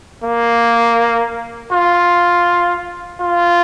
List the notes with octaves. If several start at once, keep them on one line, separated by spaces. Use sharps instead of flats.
A#3
F4
F4